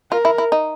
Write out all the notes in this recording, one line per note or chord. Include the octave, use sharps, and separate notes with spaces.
F4 A#4
E4
E4
D#4